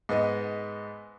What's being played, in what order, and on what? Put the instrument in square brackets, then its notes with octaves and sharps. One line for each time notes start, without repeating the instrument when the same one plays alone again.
[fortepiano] G#2 B3 D#5